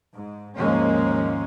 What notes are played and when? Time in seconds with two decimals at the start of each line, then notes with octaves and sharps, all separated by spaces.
0.16 G#2
0.57 D#2 G#2 F3 G#3 A#3 C#4